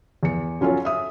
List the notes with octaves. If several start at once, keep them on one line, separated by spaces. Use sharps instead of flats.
E2 C#7
F#3 C#4 F4 A4 C#5
E5 D#6